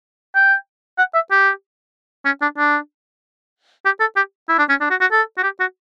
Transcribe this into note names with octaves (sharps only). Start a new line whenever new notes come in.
G5
F#5
E5
G4
C#4
D4
D4
G4
A4
G4
E4
D4
C#4
D4
F#4
F#4
A4
F#4
G4
F#4